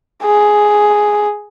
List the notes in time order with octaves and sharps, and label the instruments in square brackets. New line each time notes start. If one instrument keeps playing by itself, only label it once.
[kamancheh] G#4